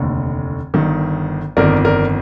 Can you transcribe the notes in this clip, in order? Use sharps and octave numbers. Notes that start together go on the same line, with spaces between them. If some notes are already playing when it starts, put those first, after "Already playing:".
Already playing: F1 D#2 D3
G1 G2 D#3
G1 F2 D#3 A#4 D5
A#4 D5